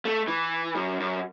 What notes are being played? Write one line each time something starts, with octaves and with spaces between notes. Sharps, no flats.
A3
E3
F#2
F#2